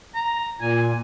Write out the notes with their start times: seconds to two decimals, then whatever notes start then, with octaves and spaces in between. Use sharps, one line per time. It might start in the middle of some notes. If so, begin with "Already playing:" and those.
0.15 A#5
0.61 A#2 G#5